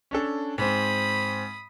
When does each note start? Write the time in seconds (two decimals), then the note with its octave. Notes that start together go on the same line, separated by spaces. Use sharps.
0.11 C#4 D4 A4
0.58 G#2 C4 B5 D#6